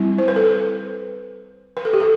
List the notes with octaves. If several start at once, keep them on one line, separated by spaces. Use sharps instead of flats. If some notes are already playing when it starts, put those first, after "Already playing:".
Already playing: G3 C4 E4
C5
B4
A4
B4
B4
A4
G4
A4